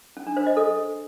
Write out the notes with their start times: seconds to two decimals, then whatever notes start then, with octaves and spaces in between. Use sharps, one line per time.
0.17 C#4
0.27 D4
0.37 C5
0.47 D#5
0.57 A4